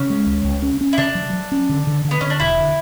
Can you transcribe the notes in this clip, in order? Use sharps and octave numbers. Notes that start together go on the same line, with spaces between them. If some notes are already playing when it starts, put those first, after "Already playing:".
Already playing: C#3 C#4
G#3
C#2
C#2
C#4
C#4
E4
C#3 D4
F#3
F#3
C#4
D3
D3
D3
B3
D3 C#4
D4
E1 E4
D3